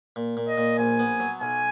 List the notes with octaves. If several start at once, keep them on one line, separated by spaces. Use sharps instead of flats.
A#2
A#2
D#5
A#2
A#1 G#5
B3
F#3
B1 G#5